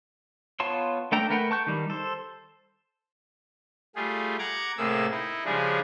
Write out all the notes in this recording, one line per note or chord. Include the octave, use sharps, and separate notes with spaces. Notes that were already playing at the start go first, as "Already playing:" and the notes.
B3 F4 C#5 A5 C6
A3 D4 A4 G5 A#5
A3 A#4 B4 F#5 G5
A5 C#6 G6
D#3 G3
A4 C5
G3 A3 F4 G#4
F#5 A#5 D6 G#6
A2 C3 A3 A#3 G#4 E6
D#4 E4
C#3 F3 G3 G#3 D4 G#4